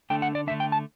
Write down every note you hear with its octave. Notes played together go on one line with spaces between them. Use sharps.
D3 A3 D4 G5
F#5
D5
D3 A3 D4 E5
G5
A5